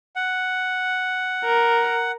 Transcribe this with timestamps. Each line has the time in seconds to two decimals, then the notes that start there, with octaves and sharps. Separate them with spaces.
0.16 F#5
1.45 A#4